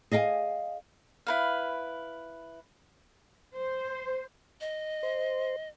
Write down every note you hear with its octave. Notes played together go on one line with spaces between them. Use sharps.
G#4 D#5 F5 G5 G#5
E4 B4 F5
C5
D#5
C5